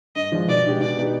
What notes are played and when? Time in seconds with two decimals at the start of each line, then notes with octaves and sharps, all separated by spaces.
0.16 G2 D#5
0.32 F3 G#3 D4 F4
0.48 B2 D5
0.64 G#3 D4 G4
0.80 B2 D5
0.98 B3 D#4 G4